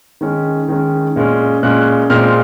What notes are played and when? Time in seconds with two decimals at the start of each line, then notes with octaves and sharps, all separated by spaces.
0.21 D#3 G#3 C#4
0.68 D#3 G#3 C#4
1.16 A#2 G#3 C#4
1.63 A#2 G#3 C#4 F#6
2.10 A#2 G#3 C4 F6